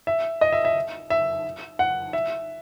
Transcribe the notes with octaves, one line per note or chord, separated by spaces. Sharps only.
E5
D#5
E5
E5
E5
F#5
E5